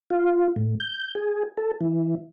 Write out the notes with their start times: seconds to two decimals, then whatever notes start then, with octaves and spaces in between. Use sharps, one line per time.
0.10 F4
0.56 A2
0.80 G6
1.15 G#4
1.57 A4
1.81 E3